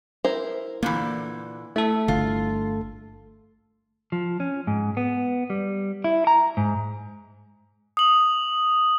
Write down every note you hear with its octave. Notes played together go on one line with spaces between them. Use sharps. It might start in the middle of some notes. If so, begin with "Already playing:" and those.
E4 A#4 C5
A#2 D3 E3 A#3
A3 E4 A4
G1 D3 F4
F3
C#4
G#2
B3
G3
E4
A#5
G#2
D#6 F#7